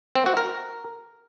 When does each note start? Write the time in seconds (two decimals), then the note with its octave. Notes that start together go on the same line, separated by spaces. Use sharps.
0.15 C4
0.26 F#4
0.37 A#4